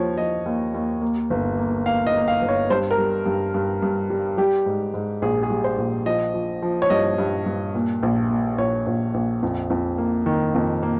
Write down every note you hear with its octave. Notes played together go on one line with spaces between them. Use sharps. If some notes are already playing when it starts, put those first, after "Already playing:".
Already playing: D#2 F3 C#5
F3 D#5
D#2
D#2
A#3
G1
A#3
A#3 F5
D#5
A#3
F5
G1
C#5
G2 C5
A#4
G3
G2
G2
G2
G3
G3 G4
G#2
G#2
A#1 G#4
G#4
G3
C5
A#1
F3 D#5
F3
F3
C#5
G2 D#5
G2
G2
A#2
A#1
A#2
A#1 C#5
A#1
A#1
F2
F2
A#3
D#3
F2
A#3